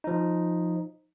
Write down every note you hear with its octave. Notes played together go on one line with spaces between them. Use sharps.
F3 D#4